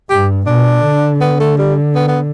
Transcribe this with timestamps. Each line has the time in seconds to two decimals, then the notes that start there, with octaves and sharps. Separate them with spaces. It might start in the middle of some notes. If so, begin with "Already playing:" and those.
0.10 G2 G4
0.46 B2 D4
0.84 D3
1.21 B3
1.40 A3
1.58 G3
1.95 B3
2.08 B3